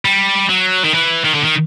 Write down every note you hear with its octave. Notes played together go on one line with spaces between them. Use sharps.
G3
F#3
D#3
E3
D#3
D3
D#3